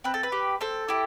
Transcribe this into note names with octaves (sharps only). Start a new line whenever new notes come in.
C4 B4
A4
B4
G4
C4 A4
E4 G4